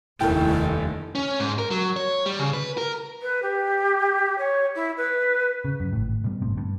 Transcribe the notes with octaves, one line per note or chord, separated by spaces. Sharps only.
F1 D#2 G3 A3 E4 A4 A#4 G5
C#4
G#2
A#4
F#3
C#5
G3
C#3
B4
A#4
B4
G4
C#5
E4
B4
C#3
F#2
G#1 A2
B2 G3
G1 A2 C4
G2